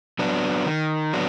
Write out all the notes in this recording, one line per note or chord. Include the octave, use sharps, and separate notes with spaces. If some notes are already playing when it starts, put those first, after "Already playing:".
F#3 B3 D4
D#3
F#3 B3 D4